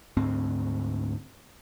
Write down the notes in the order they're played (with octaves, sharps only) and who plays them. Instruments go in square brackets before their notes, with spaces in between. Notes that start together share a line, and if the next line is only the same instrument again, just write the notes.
[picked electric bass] D2 G#2 C4